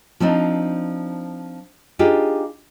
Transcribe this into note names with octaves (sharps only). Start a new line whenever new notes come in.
F3 C4 D4 D#4
D4 D#4 F4 G4 G#4